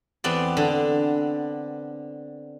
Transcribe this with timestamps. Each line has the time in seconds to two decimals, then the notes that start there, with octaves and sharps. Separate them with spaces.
0.24 E2 B3 C4 D5
0.57 D3